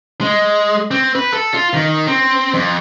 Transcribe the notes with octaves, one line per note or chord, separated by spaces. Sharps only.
G#3
C4
B4
A4
F4
D#3
C4
F2